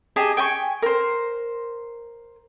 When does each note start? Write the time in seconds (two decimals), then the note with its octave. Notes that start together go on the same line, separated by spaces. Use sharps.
0.16 G4 G#4 D#5 A5
0.37 G5 G#5 A#5 C#6
0.82 A#4 C5